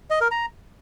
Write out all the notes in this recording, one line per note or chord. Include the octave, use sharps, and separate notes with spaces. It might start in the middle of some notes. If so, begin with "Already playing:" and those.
D#5
A#4
A#5